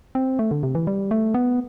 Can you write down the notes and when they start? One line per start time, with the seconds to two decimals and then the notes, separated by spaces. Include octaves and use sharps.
0.15 C4
0.39 A3
0.51 D3
0.63 C3
0.75 E3
0.87 G3
1.11 A3
1.34 B3